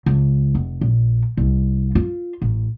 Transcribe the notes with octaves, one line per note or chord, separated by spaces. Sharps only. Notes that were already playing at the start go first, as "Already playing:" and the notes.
C#2
F1
A#1
C2
F4
A1